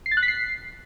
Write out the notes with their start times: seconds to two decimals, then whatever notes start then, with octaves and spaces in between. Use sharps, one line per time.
0.06 C7
0.11 A6
0.17 F#6
0.23 B6
0.28 C7